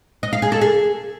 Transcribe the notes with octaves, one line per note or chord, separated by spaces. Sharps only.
D#5
F5
G#4
A4
G#4